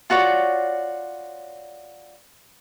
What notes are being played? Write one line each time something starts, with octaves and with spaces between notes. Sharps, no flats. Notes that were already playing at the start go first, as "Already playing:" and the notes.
F4 F#4 C#5 D5